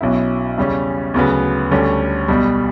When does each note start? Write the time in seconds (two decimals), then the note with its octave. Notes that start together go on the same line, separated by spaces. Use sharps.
0.01 B1 B2 F#3 C#4 E4
0.58 E2 C#3 G3 C#4
1.14 D2 C#3 F#3 B3
1.71 D2 D3 G3 C#4
2.28 B1 B2 G3